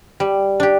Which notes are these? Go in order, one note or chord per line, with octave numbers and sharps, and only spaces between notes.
G3
D4 G4